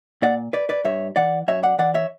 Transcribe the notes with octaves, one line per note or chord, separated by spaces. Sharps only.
A#2 D5 F#5
B4 D5
B4 D5
G2 C#5 E5
E3 D5 F#5
F#2 C#5 E5
D5 F#5
E3 D5 F#5
C#5 E5